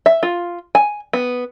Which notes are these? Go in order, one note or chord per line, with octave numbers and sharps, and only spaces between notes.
E5
F4
G#5
B3